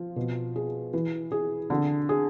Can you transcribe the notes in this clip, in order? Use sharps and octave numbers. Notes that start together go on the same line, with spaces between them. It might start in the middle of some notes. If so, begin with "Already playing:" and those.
Already playing: F3 F4
B2
G#4
E3
G#4
D3
G#4